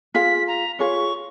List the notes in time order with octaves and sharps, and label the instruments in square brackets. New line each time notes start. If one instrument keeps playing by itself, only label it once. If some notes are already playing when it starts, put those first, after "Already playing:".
[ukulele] F4 G#4 F5 [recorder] B6
[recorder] A#5
[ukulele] F4 G#4 C#5 [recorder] C#6